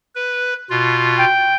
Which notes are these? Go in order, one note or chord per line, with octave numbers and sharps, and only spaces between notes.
B4
B2 F4
G5